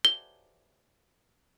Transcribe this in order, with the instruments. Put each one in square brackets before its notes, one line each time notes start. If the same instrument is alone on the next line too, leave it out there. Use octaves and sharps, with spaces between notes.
[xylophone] G7